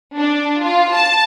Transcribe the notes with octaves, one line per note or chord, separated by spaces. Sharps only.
D4
F4
A5